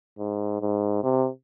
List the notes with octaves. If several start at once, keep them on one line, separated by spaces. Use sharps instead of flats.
G#2
G#2
C3